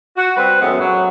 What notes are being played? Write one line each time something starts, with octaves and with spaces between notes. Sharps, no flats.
F#4
G3 C4 B4
F#2 A2 G#3 B3
F#3